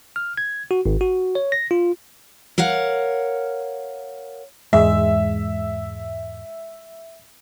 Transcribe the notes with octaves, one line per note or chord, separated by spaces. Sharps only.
F6
G#6
F#4
G#1
F#4
C#5
A#6
F4
A#4 C#5 F5 F#5
E2 G#2 G#3 E5